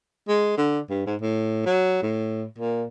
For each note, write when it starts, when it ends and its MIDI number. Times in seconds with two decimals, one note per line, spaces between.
0.28 0.53 56
0.57 0.80 50
0.90 1.06 43
1.07 1.16 44
1.21 1.64 45
1.66 2.02 54
2.03 2.45 45
2.58 2.85 46